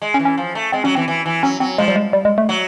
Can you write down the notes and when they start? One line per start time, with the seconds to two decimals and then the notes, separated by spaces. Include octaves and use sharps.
0.02 G#3
0.14 C#4
0.19 E3
0.25 C#4
0.38 F3
0.55 A3
0.72 G#3 C4
0.84 F#3 C#4
0.95 E3 C4
1.08 E3
1.26 E3
1.43 F#3 C#4
1.60 F#3 C4
1.78 F3 G#3
1.88 G3
1.96 G#3
2.13 G3
2.25 G#3
2.38 A3
2.49 F#3